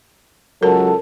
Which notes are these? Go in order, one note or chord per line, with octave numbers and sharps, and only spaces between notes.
C#2 F#3 A4 A#4